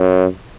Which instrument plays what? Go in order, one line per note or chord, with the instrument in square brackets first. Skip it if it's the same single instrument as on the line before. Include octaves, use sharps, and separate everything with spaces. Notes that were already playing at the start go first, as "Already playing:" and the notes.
Already playing: [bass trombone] F#2